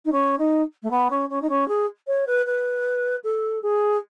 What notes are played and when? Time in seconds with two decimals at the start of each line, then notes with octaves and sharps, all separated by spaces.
0.05 D#4
0.12 C#4
0.38 D#4
0.83 A3
0.90 B3
1.10 C#4
1.29 C#4
1.42 D#4
1.49 C#4
1.68 G#4
2.07 C#5
2.27 B4
2.46 B4
3.24 A4
3.62 G#4